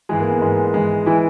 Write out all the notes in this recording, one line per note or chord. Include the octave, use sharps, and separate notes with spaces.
G#2 E3 G#3 G#4
A#3
B3
G#2 E3 G#3
G#2 E3 G#3
E3 G#3 E4